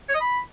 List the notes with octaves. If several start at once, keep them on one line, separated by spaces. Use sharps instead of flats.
C#5
D#5
B5